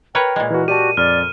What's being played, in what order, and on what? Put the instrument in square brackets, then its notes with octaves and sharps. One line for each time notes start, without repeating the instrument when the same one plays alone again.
[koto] A#4 B4 C#5 [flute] G5 [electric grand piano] F6
[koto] A#2 G#3
[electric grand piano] E3 F#4 [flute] B4
[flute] F#4 [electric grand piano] G4 D5 A5 [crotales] D#7
[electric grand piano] F2 [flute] D5 [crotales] F6